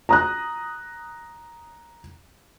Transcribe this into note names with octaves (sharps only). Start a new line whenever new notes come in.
A#5 D#6 F#6